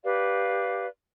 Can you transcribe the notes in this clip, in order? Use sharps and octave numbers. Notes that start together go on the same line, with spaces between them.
G4 B4 D5 F5